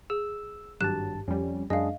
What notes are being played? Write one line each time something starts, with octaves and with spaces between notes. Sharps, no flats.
G#4 E6
G#1 G2 F#3 G4 A5 F#6 E7
F2 G3 C#4
F#2 G#3 D4 G#4 D#5 F5